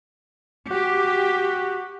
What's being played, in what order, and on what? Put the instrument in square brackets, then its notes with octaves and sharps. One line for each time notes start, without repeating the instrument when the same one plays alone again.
[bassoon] F#4 [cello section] G4